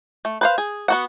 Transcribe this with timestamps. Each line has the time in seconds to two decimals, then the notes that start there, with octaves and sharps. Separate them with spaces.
0.25 A3
0.41 B4 C5 F5
0.58 G#4
0.88 B3 F#4 F#5